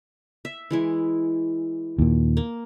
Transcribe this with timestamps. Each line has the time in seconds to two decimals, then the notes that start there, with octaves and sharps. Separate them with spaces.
0.45 E5
0.71 E3 G#3 E4
1.98 D#2 A#2
2.37 A#3